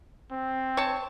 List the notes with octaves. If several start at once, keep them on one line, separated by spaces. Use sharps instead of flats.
C4
C#5 A5